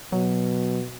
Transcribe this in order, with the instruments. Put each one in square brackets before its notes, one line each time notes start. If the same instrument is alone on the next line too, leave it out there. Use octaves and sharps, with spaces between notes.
[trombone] B2 [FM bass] F#3